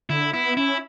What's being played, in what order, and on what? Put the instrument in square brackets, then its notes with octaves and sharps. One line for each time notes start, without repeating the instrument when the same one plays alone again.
[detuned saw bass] D3 [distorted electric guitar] E4
[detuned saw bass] B3 [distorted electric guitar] E4
[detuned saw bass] C#4 [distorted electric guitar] E4